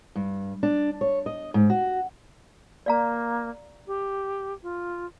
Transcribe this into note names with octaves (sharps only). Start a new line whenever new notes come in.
G2
D4
C#5
D#5
G#2
F#4
A#3 D5 F5 A#5
G4
F4